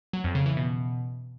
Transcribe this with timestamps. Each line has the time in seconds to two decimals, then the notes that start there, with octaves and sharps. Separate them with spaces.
0.13 F#3
0.24 F2
0.35 C#3
0.46 E3
0.57 B2